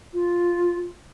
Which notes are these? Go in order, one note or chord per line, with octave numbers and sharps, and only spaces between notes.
F4